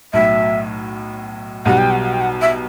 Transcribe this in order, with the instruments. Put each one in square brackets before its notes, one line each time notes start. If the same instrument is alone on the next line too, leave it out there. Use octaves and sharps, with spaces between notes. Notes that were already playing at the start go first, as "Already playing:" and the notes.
[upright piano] B1 A2 F#3 [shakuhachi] E5
[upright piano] B1 B2 G3 [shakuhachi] F#5
[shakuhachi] G5
F#5
F#5
G5
F#5
E5